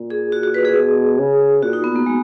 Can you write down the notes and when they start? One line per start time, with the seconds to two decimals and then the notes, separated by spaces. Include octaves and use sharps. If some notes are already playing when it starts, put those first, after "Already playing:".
Already playing: A#2
0.10 G#4
0.32 F#4
0.43 F#4
0.54 B4
0.65 G#4
0.75 B2
1.19 C#3
1.63 A#2 F#4
1.73 D#4
1.84 B3
1.96 A#3
2.06 G#3